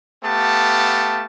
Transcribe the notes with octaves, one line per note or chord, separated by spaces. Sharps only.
A3 B3 G4 F5 A5